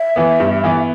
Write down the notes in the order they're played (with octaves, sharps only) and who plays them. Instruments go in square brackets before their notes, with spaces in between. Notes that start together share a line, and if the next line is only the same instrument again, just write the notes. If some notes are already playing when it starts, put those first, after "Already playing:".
Already playing: [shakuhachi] E5
[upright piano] E3 B3
G2
E3 B3